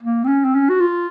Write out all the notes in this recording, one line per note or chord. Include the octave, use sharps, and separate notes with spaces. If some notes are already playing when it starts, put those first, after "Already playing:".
A#3
C4
C#4
C4
C#4
F#4
F4